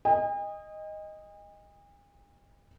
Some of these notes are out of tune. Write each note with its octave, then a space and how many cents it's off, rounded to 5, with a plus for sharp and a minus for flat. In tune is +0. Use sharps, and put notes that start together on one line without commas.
D#5 +0 G#5 -45